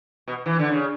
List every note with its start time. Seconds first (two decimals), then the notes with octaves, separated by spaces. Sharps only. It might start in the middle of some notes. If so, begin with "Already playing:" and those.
0.28 B2
0.46 E3
0.59 D3
0.71 C#3